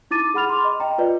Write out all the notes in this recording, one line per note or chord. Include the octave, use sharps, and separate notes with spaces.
D#4 E4 D6 A6 D#7
G#4 F#5 B5 F6 F7
C6 D6
D#5
D#5 G5 A#5
F4 B4 D5 D#5